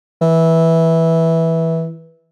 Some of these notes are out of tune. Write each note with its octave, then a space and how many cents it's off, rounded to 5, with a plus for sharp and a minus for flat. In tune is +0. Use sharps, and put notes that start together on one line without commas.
E3 -10